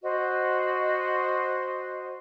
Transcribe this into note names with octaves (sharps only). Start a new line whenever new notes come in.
F#4 C5 D#5